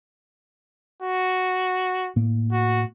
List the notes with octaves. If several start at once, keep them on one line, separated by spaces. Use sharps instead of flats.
F#4
A2 A#3
F#4